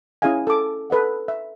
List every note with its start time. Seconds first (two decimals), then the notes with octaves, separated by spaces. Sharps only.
0.22 C#4 E4 G#4 D#5 F5 G#5
0.47 A4 D6
0.90 A4 B4 D#5 F#5
1.28 E5